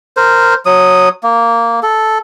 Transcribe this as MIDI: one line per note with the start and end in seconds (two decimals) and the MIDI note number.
0.17 0.54 70
0.17 0.54 72
0.66 1.09 54
0.66 1.09 87
1.23 1.80 58
1.83 2.18 69